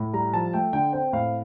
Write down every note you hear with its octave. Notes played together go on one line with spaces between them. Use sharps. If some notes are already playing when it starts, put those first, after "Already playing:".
Already playing: A2
G3 A#5
F3 A5
A3 G5
D3 G5
C4 G5
A2 F5